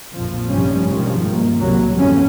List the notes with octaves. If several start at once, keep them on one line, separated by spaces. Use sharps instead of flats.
A#1 F2 F3
F1 G2 C3 F3 G3 C#4
G2 B2 D#3 F3 G#3
A#3
C2 A2 C3 F#3
A1 F2 G#2 D3 B3 C#4